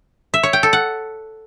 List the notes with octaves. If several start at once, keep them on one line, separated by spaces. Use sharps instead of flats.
E5
C#5
G5
A4
F#5